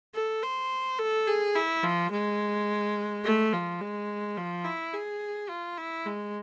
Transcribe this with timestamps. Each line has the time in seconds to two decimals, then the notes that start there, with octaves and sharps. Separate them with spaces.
0.15 A4
0.43 C5
0.99 A4
1.27 G#4
1.55 E4
1.83 F3
2.11 G#3
3.24 A3
3.53 F3
3.81 G#3
4.37 F3
4.65 E4
4.93 G#4
5.49 F4
5.78 E4
6.06 G#3